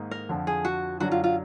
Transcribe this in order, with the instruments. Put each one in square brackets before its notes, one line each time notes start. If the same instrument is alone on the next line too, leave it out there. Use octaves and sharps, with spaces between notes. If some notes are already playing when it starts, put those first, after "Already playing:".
Already playing: [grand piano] G#2 D#3 A#3 D#4
[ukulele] A#4
[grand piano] F2 D3 F3
[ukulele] G#4
F#4
[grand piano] F#2 D3 F#3 D4 [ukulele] F#4
[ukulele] F4
F4